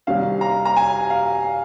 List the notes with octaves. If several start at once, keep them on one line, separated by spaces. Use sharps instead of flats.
C2 C3 D#3 F5
A#5
A#5
G#5
F5